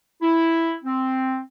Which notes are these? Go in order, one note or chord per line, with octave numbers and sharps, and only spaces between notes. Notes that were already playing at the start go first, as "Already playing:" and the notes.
E4
C4